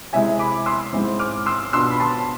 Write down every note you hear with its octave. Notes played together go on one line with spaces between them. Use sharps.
C3 G#3 C4 E4 E5 G#5
B5 D6
C6 E6
G#2 G#3 C4 E4
D6 F6
C6 E6
B2 B3 D4 F4 C6 E6
B5
A5 C6